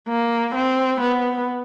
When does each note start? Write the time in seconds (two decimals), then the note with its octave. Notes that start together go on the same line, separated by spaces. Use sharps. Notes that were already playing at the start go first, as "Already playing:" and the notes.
0.08 A#3
0.55 C4
1.01 B3